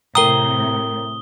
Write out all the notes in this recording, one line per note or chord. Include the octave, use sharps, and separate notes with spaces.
A2 C3 A#4 G5 A#5 D#6 G7